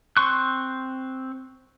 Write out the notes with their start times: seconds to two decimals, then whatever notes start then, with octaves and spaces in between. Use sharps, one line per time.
0.17 C4 C6 C#6 F#6